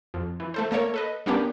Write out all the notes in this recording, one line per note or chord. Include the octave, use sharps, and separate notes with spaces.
F2
E3
A3 A4 C5
A3 A#3 A#4 C#5
A4 B4 D#5
G3 A#3 B3 C#4 D4 G4